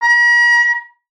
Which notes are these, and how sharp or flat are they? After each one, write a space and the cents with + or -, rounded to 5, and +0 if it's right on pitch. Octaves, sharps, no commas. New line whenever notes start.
A#5 +45